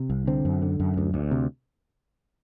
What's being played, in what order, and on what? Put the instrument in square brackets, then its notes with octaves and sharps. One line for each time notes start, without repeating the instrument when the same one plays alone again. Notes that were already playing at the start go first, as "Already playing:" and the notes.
Already playing: [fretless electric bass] C3
C2
D3 C4
F#2
D3
F#2
D2
D2
C3